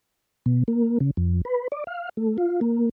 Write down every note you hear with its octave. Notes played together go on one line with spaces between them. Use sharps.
B2
A#3
C#3
F2
B4
D5
F5
A3
F4
A#3